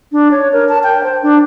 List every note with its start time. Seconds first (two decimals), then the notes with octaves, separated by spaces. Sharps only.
0.12 D4
0.31 C#5
0.53 A#4
0.69 A5
0.83 G5
1.03 C5
1.23 D4